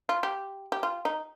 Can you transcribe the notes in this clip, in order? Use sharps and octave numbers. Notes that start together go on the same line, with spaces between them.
F4
G4
G4
F4
D#4